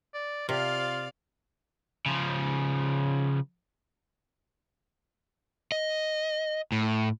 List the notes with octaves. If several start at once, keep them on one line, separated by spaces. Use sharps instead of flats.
D5
C3 F4 D5 F5
C#3 F3
D#5
A2